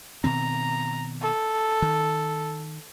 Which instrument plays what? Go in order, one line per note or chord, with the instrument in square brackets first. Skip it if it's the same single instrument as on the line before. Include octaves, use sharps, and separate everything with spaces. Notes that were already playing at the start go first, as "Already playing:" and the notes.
[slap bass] B2 D#3 C4 [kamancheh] A#5
[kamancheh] A4
[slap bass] D#3